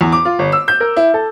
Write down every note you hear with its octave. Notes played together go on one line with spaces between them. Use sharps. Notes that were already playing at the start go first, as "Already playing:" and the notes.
E2
D6
F4
G1
E6
G6
A#4
E4
A4